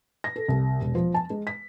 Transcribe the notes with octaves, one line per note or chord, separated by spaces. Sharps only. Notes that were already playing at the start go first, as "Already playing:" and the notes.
A#6
A4
C2
E1
F3
A5
G#3
B6